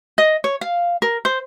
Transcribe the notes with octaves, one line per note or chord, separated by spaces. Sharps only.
D#5
C#5
F5
A#4
C5